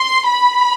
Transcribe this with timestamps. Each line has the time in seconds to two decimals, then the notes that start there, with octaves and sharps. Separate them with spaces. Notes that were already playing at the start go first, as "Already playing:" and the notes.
Already playing: C6
0.30 B5